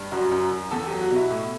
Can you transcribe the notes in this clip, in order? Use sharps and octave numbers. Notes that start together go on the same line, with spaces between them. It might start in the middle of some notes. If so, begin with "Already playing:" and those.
Already playing: G2
F#2 F#4
F#2
F#2
E2 A4
F#3 G4
F#4
B2
E4
A2